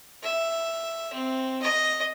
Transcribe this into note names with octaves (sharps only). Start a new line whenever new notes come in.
E5
C4
D#5